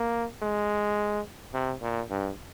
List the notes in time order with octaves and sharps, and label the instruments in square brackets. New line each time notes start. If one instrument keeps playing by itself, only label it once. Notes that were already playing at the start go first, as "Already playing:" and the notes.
Already playing: [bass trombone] A#3
G#3
C3
A#2
G2